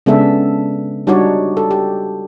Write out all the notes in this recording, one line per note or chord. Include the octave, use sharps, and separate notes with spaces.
C#3 G#3 B3 D4 A4 E5
G3 D4 D#4 F#4 C#5 D5
A4
G4